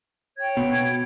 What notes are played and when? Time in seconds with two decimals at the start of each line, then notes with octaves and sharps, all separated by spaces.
0.38 C#5 G5 G#6
0.57 B2